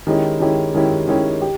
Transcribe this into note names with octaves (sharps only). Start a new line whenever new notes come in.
D#3 G#3 C#4 E4 G4
D#3 G#3 C#4 E4 G4
D#3 G#3 C#4 E4 G4
D#3 G#3 C#4 E4 G4
G4